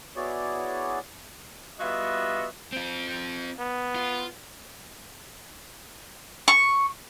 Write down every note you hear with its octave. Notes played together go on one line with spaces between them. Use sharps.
B3 E4 F#4 G#4 C#5 D5
G3 B3 F4 F#4 D#5 E5
C4 F4
B3
F4
C#6